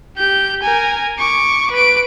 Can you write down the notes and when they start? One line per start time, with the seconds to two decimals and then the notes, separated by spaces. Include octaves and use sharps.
0.17 G4 G6
0.62 A#4 G#5
1.19 C#6 D6
1.72 B4 D7